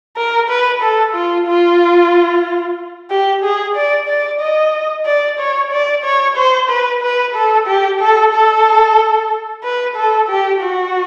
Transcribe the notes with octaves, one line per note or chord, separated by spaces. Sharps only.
A#4
B4
A4
F4
F4
G4
G#4
D5
D5
D#5
D5
C#5
D5
C#5
C5
B4
B4
A4
G4
A4
A4
B4
A4
G4
F#4